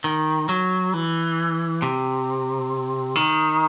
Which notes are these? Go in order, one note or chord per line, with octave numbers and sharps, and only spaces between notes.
D#3
F#3
E3
C3
D#3